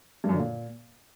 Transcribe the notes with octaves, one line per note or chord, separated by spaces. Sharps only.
G2
F#2
D3
A#2